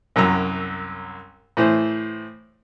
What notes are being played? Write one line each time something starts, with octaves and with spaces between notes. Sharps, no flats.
C2 F#2 F#3 A#5 E6
A2 E3 C5